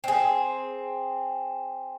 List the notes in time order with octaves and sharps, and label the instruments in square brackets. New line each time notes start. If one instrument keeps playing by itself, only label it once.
[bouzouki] C4 G#4